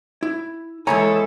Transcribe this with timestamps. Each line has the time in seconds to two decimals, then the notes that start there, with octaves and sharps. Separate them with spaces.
0.23 E4
0.87 E2 D#3 G#3 E4 A4 C#5 G#5 A#5